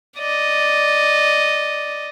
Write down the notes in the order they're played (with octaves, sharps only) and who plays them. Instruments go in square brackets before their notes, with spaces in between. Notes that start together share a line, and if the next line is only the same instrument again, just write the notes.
[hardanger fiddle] D5 D#5